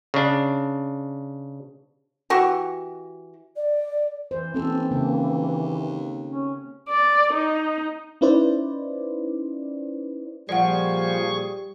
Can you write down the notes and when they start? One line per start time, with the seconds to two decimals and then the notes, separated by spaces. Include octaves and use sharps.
0.14 C#3 D4
2.30 E3 F#4 G4 C#6
3.56 D5
4.31 E3 C5
4.54 D#1 E3 C4 A4
4.91 D#2 C#3 A#3
6.30 C#4
6.89 D5
7.33 D#4
8.21 C#4 D#4 E4 B4 C5 D5
10.49 A#2 F3 G3 G#4 D5 F#5 C#6